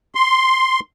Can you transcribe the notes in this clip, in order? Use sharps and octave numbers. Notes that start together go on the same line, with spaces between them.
C6